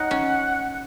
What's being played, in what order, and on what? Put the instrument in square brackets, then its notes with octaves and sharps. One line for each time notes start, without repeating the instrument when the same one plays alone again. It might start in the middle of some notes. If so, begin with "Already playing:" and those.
Already playing: [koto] D#4 C#5 [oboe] F#5
[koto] C#4